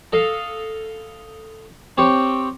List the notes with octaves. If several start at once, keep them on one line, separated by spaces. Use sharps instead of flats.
A4 D#5 F5
C4 G4 C#5